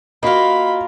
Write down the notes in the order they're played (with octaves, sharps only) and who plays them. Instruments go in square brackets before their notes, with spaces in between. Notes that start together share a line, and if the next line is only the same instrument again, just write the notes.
[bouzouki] A#3 F4 [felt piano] F#4 D#5 [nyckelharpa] B5